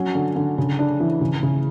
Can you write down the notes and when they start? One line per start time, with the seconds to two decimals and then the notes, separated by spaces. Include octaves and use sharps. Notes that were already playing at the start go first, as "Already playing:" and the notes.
Already playing: F#3 C#4
0.15 D3
0.36 D3
0.58 C#3
0.79 D4
1.00 E3
1.21 C#3
1.43 C#3